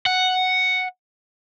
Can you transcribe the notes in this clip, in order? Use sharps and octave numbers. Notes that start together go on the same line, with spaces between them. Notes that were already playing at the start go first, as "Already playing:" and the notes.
F#5